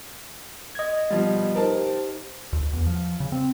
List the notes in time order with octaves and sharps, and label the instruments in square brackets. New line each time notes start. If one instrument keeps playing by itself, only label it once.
[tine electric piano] D#5 G#6
[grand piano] B2 F3 G3
[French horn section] D#4 G4 C5 [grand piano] A#4 A5
[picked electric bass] D2
E2
F3
C#3
C4